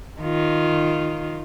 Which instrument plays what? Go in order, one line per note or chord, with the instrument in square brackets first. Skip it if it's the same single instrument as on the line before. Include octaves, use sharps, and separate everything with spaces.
[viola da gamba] D#3 F4